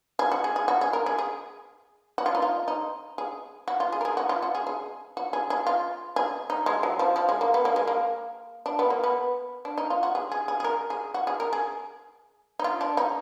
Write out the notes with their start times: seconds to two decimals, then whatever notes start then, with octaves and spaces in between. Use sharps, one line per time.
0.19 G#4
0.31 F#4
0.44 G#4
0.56 G#4
0.68 F#4
0.81 G#4
0.93 A#4
1.06 G#4
1.18 G#4
2.18 F#4
2.26 F4
2.35 D#4
2.42 F4
2.68 D#4
3.18 G#4
3.68 F#4
3.80 F4
3.92 G#4
4.01 A#4
4.05 G#4
4.17 F#4
4.29 F4
4.42 F#4
4.55 G#4
4.67 G#4
5.17 F#4
5.33 G#4
5.50 G#4
5.67 F4
6.16 G#4
6.50 D#4
6.66 G#3
6.83 F#3
6.99 F3
7.16 F3
7.29 G#3
7.41 A#3
7.54 B3
7.65 A#3
7.76 G#3
7.87 A#3
8.66 D4
8.79 B3
8.90 A#3
9.03 B3
9.65 D4
9.78 D#4
9.90 F4
10.03 F#4
10.15 G#4
10.32 G#4
10.48 G#4
10.60 G#4
10.64 A#4
10.90 G#4
11.14 F#4
11.27 G#4
11.40 A#4
11.53 G#4
12.59 D#4
12.64 F4
12.81 D4
12.97 D#4